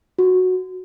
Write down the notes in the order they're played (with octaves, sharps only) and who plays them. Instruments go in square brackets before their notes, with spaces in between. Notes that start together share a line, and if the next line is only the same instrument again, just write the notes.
[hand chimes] F#4